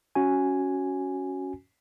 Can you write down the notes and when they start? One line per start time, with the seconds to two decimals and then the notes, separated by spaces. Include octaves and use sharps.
0.15 C#4 F#4 G#5